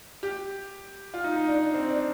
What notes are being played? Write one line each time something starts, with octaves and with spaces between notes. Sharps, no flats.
G4
F4
D#4
D#4
D4
D4
C4
D4